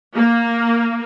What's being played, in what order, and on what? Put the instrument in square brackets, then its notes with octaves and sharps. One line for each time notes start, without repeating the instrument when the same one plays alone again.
[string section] A#3